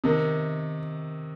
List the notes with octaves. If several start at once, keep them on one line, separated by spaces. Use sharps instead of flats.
C3 D#3